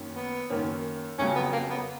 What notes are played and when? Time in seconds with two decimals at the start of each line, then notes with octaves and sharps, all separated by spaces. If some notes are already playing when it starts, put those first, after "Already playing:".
Already playing: F#2 D#3 A#3 C#4
0.15 B3
0.50 F#2 D#3 A#3 C#4
1.18 F2 C#3 F#3 C#4
1.35 B3
1.52 A#3
1.70 B3